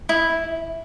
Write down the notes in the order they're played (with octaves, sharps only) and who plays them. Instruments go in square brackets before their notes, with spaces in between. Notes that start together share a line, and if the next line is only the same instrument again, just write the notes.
[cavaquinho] E4